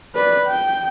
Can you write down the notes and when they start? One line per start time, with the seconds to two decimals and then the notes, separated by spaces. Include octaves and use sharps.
0.15 B4 D5
0.47 G5